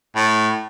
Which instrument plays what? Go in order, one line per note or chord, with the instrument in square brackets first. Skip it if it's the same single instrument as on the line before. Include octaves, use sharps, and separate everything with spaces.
[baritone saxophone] A2